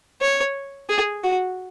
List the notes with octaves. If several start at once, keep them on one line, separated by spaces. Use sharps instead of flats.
C#5
G#4
F#4